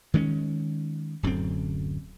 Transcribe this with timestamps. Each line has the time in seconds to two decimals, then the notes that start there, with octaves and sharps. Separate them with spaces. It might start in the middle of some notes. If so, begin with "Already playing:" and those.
0.14 D#3 G#3 C4 C#4
1.23 D1 F#2 D3 C4